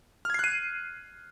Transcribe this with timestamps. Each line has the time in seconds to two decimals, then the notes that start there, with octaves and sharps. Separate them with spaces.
0.25 F6
0.30 G#6
0.34 C7
0.39 F#6
0.44 D#7